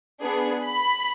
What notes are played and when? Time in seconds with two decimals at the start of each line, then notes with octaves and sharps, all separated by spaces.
0.22 B3 D4 G#4
0.63 B5